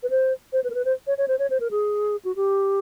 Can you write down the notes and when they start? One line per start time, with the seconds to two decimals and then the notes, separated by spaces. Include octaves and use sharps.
0.03 B4
0.10 C5
0.53 C5
0.64 B4
0.70 A#4
0.75 B4
0.85 C5
1.07 C#5
1.18 C#5
1.28 C5
1.39 C#5
1.50 C5
1.60 A#4
1.71 G#4
2.25 F#4
2.36 G4